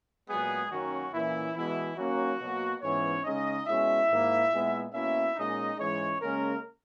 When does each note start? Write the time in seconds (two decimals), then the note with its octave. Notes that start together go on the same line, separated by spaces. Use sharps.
0.28 A#2 F#3 G#3 B3 G#4
0.70 F#2 D#3 F#3 A#3 C#4 F#4
1.13 A#2 E3 A#3 C#4 E4
1.55 B2 E3 G#3 B3 E4
1.97 D#3 F#3 A#3 C#4 F#4
2.40 B2 F#3 A#3
2.82 G#2 E3 B3 C#4 C#5
3.24 C#3 G#3 C#4 D#4 D#5
3.66 B2 G#3 C#4 E4 E5
4.10 G#2 D#3 A#3
4.52 A#2 G#3 B3
4.93 B2 A#3 C#4 E4 E5
5.36 A#2 G#3 C#4 D#4 D#5
5.78 G#2 E3 G#3 C#4 C#5
6.20 C#3 G#3 A#3 C#4 A#4